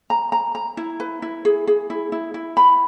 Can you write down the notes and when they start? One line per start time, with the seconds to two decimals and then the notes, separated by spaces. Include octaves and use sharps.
0.10 A#5
0.32 A#5
0.55 A#5
0.77 E4
1.00 B4
1.22 E4
1.45 G#4
1.67 G#4
1.90 E4
2.12 E4
2.34 E4
2.57 B5